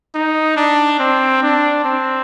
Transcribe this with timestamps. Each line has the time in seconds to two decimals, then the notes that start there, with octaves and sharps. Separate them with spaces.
0.15 D#4
0.57 D4
0.99 C4
1.42 D4
1.85 C4